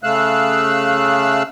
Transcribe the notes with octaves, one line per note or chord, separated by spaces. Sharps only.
C#3 A3 F5 E6 F#6